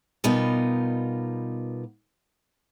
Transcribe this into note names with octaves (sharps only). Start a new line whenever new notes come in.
B2 G3 B3 D#4 F4 A#4